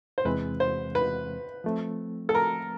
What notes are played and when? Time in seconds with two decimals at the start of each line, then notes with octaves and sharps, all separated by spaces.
0.18 C5
0.25 E2 C3 E3 G#3 C4 B4
0.60 C5
0.95 B4
1.64 F3 A3 C4
2.29 A4
2.35 A#4